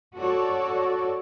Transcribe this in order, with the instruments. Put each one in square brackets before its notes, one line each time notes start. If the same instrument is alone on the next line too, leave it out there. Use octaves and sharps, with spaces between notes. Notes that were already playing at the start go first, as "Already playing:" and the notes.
[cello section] F#4 A4 C#5 D5